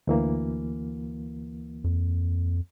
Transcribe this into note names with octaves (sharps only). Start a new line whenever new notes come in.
D2 E3 A#3
F2